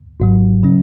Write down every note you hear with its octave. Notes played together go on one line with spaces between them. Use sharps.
G#1 G#2 F#3
C#3 F#3 C#4